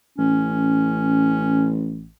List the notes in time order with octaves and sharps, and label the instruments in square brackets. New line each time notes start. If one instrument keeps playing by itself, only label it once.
[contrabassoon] A1 [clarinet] C#4